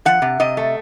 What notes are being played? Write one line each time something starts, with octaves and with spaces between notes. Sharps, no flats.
F3 F#5
C3
C3 D#5
A3